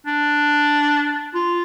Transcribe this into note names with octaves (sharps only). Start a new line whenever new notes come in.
D4
F4